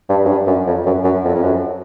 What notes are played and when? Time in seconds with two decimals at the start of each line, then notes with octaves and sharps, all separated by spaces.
0.09 G2
0.25 F#2
0.29 G2
0.47 F#2
0.67 F2
0.86 F#2
1.04 F#2
1.24 F2
1.35 F2
1.42 F#2